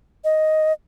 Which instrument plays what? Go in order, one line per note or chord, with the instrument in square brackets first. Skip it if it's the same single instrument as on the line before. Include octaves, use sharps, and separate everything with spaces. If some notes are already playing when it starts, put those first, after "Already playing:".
[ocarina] D#5